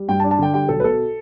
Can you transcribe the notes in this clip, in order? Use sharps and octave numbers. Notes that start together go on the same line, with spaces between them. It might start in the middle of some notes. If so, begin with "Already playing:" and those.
Already playing: G3
G2 G5
A5
D4
A5
D3 G5
G3 G5
B1 A4
B4
B2 A4